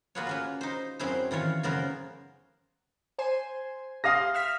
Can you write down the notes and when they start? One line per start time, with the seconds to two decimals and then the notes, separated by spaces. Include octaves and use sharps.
0.15 A#3 F4 F#4 G#4 B4 C#5
0.27 A#3 C#4 B4
0.61 D#4 C5
0.99 F#2 C4 C#4 E4 G#4 C5
1.31 D#3 E3 F4 C#5
1.63 F#2 C#3 B3 C#4 A#4 C5
3.19 C5 G#5 C6
4.04 G4 F5 C6 D#6 A#6
4.34 E5 F6 B6